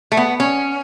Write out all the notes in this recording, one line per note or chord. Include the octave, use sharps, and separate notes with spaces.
A3
B3
C#4